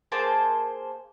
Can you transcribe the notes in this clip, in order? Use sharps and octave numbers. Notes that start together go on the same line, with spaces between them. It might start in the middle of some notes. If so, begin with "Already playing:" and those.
A#3 G#4 C5 A5